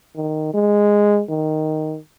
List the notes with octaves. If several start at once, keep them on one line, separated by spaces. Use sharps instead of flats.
D#3
G#3
D#3